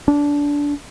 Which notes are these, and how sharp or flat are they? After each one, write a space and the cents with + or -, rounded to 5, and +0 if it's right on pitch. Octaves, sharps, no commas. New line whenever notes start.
D4 -20